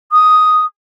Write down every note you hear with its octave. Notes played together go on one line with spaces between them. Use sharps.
D#6